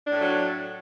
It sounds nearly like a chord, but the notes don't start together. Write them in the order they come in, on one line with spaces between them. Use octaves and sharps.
D4 A2 A3 F#3